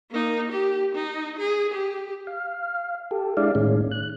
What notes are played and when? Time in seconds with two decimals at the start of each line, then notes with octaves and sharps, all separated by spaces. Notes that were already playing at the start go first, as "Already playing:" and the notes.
0.11 A#3 D#4
0.52 G4
0.95 D#4
1.39 G#4
1.74 G4
2.27 F5
3.11 G4 A4
3.37 G#3 D4 E4 D5 F5
3.55 A2 D#3 G#3 C#4
3.91 F#6